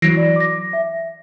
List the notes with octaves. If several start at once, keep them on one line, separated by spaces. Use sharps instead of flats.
E3 F#3 A#6 C7 D7
D5
D6 A#6
E5